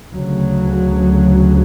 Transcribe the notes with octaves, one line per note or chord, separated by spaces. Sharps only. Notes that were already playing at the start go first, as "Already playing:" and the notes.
D2 C#3 F#3